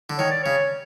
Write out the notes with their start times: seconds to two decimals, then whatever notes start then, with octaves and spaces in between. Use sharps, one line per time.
0.10 D3
0.18 D#3 C#5
0.31 D5
0.43 C#3 C#5